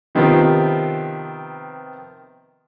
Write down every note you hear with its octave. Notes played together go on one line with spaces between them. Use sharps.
C3 D#3 F3 B3 C4